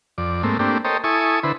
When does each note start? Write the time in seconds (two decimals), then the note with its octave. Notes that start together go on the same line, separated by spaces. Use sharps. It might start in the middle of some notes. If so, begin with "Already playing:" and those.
0.18 F2 D5
0.43 G#2 A3 A#3 C4
0.59 A3 A#3 C4 D4 G4
0.85 A4 A#4 C5 C#5 D#5 G5
1.04 E4 A4 G#5 C#6 D#6
1.43 D3 E4 B4 C5